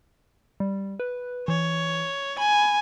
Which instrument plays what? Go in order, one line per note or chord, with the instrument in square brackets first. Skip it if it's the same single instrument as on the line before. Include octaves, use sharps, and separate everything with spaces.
[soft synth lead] G3
B4
[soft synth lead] E3 [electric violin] C#5
[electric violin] G#5 [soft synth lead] B5